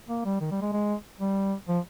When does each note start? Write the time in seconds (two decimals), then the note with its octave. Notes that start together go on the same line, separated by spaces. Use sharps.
0.09 A#3
0.25 G3
0.41 D#3
0.51 G3
0.62 G#3
0.72 G#3
1.20 G3
1.68 F3